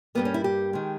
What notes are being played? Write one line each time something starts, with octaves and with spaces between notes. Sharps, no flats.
G2 G3 A#3 B3
C#4
E4
G4
D#3 G#3